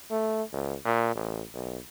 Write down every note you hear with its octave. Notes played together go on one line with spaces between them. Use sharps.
A3
C#2
A#2
A1
B1